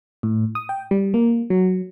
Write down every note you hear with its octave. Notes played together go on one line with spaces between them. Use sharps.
A2
D#6
G5
G3
A#3
F#3